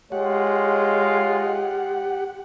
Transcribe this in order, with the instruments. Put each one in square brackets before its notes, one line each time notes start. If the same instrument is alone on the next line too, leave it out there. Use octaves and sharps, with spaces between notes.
[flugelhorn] G#3 [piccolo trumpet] F4 [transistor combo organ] G4 F#5 [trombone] C#5